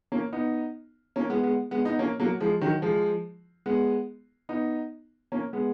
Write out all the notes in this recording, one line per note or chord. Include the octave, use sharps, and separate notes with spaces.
A#3 C#4
B3 D#4
A#3 C#4
G#3 B3
G#3 B3
G#3 B3
B3 D#4
A#3 C#4
F#3 A#3
F3 G#3
D#3 F#3
F3 G#3
G#3 B3
B3 D#4
A#3 C#4
G#3 B3